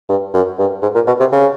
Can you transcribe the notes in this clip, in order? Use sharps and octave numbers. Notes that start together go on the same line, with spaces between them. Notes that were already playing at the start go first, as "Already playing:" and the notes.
G2
F#2
G2
G#2
A#2
B2
C3
C#3